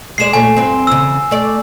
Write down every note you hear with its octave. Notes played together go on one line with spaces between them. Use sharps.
G#3 G#4 D5 C7 E7
A#2 A3 C#4 G#5
G2 C4
E2 C#3 E6
A3 D5